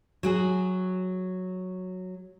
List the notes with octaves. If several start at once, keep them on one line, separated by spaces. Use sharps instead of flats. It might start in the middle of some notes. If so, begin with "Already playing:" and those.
F#3 F#4 G#4